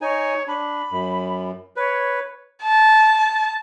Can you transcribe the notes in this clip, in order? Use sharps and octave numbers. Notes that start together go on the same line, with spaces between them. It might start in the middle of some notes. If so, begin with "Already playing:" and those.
D#4 C#5 G#5
D4 B5
F#2
B4 C#5
A5